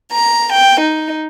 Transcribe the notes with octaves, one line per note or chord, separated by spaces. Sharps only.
A#5
G5
D#4